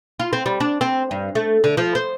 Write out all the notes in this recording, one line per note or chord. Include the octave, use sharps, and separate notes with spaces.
F4
C4
G3
D4
C4
G2
A3
D3
F3
C5